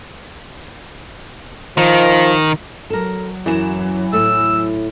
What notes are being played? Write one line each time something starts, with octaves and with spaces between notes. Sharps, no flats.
D#3 F3
F#3 A4 A#4
F#2 E3 F#4 E7
A2 A3 E6